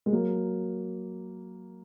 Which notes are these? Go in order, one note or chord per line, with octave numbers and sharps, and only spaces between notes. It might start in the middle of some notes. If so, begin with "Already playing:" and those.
G#3
F#3 A#3